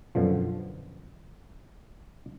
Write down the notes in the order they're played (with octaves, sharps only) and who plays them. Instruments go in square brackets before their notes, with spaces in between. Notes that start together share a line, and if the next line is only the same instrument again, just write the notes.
[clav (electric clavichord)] F#2 B2 D3 F3